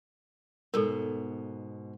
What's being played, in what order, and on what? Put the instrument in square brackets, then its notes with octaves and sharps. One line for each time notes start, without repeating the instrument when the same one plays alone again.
[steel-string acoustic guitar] G#2 B2 [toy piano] A4 A#4